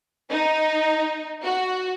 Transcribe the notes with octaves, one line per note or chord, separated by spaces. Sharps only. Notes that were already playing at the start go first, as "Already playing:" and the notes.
D#4
F#4